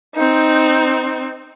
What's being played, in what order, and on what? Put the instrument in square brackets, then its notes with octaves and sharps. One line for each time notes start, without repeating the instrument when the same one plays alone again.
[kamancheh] C4 D#4